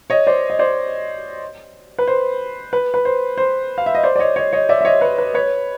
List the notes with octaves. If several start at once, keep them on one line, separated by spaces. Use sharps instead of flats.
C#5 D#5
C5 D5
D#5
C5 D5
B4
C5
B4
B4
C5
C5
F5
E5
D#5
C5 D5
D5
C#5 D#5
C#5 D#5
C#5 D#5
D5 E5
E5
C#5 D#5
B4 C#5
B4
B4 C#5